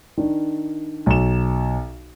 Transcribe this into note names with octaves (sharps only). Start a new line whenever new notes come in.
D#3 D4
B1 E7